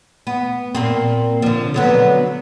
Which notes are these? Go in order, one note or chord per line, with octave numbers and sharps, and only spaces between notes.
B3
A#2 A#3 C4
D3 F3
D3 F#3 B3